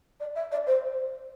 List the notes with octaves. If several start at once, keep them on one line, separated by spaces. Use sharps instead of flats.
D5
E5
D5
C5